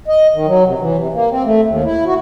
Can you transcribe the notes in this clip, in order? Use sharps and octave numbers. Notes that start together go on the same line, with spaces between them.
D#5
D#3
F#3
C3
E3
C3
A#3
C4
A3
D#2
E4
F#4